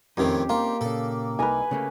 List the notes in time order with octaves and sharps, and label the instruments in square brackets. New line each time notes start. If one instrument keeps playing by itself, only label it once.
[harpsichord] F2 A2 D#3 [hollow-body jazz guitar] C4 C#4 D#4 [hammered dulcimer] G4
[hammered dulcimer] A#3 [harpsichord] F4
[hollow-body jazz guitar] A#2 C#3 [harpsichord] A4
[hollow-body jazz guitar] C2 D#4 A#4 [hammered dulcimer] B4 G#5
[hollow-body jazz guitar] C#3 A3 A#3